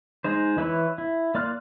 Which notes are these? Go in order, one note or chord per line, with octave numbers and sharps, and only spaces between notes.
G#3 D#4 C5
E3 E4 B4 C#5
E4
A#3 D5 C6 F6 F#6